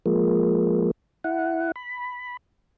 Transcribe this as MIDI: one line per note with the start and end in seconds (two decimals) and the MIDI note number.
0.06 0.91 53
0.06 0.91 56
0.06 0.91 58
1.24 1.72 64
1.24 1.72 78
1.76 2.37 83